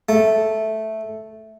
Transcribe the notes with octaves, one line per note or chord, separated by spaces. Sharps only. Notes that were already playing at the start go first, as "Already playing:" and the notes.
A3